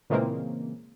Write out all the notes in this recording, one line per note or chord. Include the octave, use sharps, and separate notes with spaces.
A#2 C#3 E3 G#3 A#3 C4